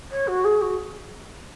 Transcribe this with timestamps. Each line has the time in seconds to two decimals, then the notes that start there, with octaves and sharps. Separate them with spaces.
0.11 C#5
0.27 F#4
0.44 G#4
0.61 F#4